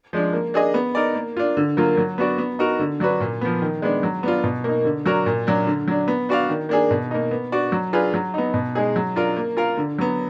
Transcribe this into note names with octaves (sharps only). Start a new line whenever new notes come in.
F3 G#3 D4
A#3
D4 G#4 D#5
B3
D#4 A#4 D5
A#3
D4 F4
D3
F#3 A#3 F4
F#3
B3 D4 F#4 D5
B3
D#4 F#4 A#4
D3
F#3 D4 F#4 B4
A#2
F3 B3
D#3
G#3 B3 D4
F#3
B3 D4 F4
B2
A#3 D#4
D3
F#3 D4 F#4 A#4
A#2
F#3 D4
D3
F#3 D4
B3
D4 F#4 D5 F5
D#3
A#3 D4 G#4
B2
A#3 D#4
B3
D4 F#4 D5
F#3
D4 F4 G#4 B4
F#3
B3 D#4
B2
G#3 D#4 G#4
F#3
D4 F4 A#4
A#3
F4 A#4 F5
D3
F#3 B3